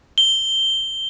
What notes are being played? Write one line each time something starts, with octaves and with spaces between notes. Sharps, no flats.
G7